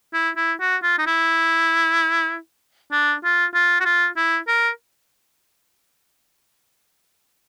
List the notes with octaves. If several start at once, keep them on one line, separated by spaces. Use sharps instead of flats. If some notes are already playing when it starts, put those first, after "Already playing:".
E4
E4
F#4
F4
D#4
E4
D4
F4
F4
F#4
F4
E4
A#4